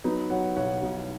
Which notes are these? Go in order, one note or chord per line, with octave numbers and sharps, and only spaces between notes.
F#3 B3 D#4
F#3 C#5 F#5
B1 C#5 F#5
B1